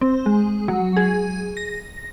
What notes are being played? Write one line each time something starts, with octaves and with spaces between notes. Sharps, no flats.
C4
G#3
F#3
G#4
A#6